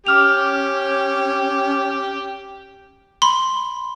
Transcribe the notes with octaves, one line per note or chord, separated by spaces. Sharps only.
C#4 G4 D6 F6 F7
B5 C6